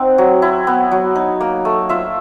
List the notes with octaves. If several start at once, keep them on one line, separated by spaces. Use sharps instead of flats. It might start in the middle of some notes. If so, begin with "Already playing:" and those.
Already playing: C4 D#4 F#5
F#3
E4
B3
F#3
D#4
A#3
A3
F4 E5